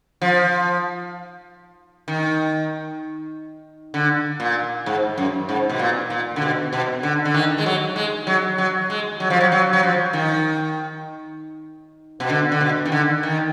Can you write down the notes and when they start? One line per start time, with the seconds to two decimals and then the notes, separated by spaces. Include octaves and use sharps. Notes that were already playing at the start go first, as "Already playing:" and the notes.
0.22 F3
2.08 D#3
3.94 D3
4.40 A#2
4.86 G#2
5.18 F#2
5.49 G#2
5.69 B2
5.79 A#2
6.10 A#2
6.36 D3
6.42 B2
6.73 B2
7.03 D3
7.25 D3
7.34 D#3
7.58 G#3
7.66 F#3
7.96 G#3
8.27 F#3
8.58 F#3
8.90 G#3
9.20 F#3
9.30 F3
9.41 F#3
9.52 F#3
9.73 F#3
9.83 F3
10.13 D#3
12.20 B2
12.30 D3
12.52 D3
12.61 B2
12.86 D#3
12.92 D3
13.23 D#3